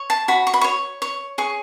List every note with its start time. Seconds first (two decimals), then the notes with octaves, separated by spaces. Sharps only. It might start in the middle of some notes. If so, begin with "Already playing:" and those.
Already playing: C#5
0.10 A5
0.28 F#4 B5
0.47 C#6
0.54 B5
0.61 C#5 C#6
1.02 C#5
1.38 G#4 C#6